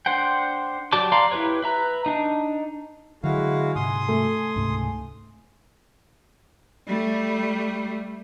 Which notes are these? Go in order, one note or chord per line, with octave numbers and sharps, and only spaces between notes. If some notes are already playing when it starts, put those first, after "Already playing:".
D4 C5 F#5 G5
F#3 G4 D5 A5 D6
D5 F5 A#5 C6 D6
E4 G4 B4 C#5
B4 E5 A#5
D4 D#4
D3 F#3 G#3 E4 F#4 F5
G#2 C3 G#5 C6 D#6
A3
C#2 G#2 C3
G3 A3